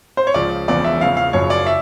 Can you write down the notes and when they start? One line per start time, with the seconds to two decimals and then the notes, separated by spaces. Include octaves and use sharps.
0.17 C5
0.27 C#5
0.34 C#2 C#3 F3 D5
0.67 E1 E2 C#3 F3 D5
0.84 E5
1.01 E2 C#3 F3 F5
1.17 F5
1.33 F#1 F#2 C#3 F3 C#5
1.50 D5
1.67 E5